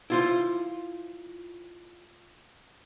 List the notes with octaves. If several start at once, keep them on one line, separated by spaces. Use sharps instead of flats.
E4 F4 C5